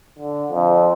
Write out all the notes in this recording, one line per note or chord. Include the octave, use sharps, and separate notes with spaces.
D3
F2